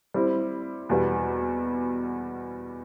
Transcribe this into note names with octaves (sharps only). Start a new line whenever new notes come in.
G3 C4 E4
E2 B2 G3 B3